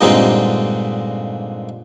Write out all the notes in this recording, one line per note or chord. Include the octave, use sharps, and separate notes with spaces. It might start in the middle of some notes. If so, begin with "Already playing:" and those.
G2 A#2 D3 G#3 C4 D#4